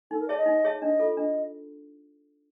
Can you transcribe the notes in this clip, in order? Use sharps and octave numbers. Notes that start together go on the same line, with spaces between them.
D#4 A4
A#4
G#4 C#5 D5 E5 A5
D#5
D#4
G#4 C#5 E5 A5
D4 D#5
F4 A4
D4 D#5